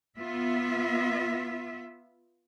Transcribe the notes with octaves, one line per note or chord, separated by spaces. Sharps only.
B3 F4 E5